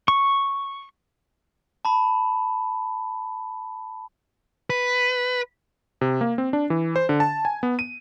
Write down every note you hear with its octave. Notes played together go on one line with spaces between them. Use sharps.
C#6
A5 B5
B4
C3
A#3
C4
D4
E3
C5
D3
A5
G#5
B3
D#7